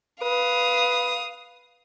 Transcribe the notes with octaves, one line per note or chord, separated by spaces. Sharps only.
B4 F5 D#6